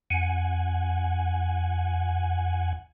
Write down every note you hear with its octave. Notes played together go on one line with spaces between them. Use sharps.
F2 F#5 G#5